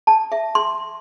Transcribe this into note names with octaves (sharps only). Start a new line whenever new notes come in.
A5
E5
C6